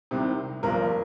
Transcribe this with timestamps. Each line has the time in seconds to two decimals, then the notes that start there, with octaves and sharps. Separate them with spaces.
0.11 C2 C3 D#3
0.63 G1 G2 F3 A#4